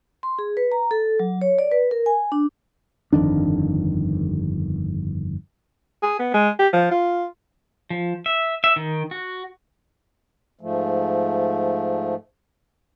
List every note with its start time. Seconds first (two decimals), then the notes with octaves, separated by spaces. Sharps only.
0.23 C6
0.39 G#4
0.57 B4
0.72 A#5
0.91 A4
1.19 F#3
1.41 C#5
1.59 D5
1.72 B4
1.91 A#4
2.06 G#5
2.32 D4
3.13 G1 F2 D#3 D4
6.03 G#4
6.19 B3
6.34 G#3
6.59 G4
6.73 F3
6.91 F4
7.90 F3
8.26 E5
8.64 E5
8.76 D#3
9.11 F#4
10.61 G#2 F3 A3